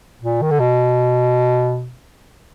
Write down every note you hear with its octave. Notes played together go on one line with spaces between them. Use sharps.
A#2
D#3
D3
B2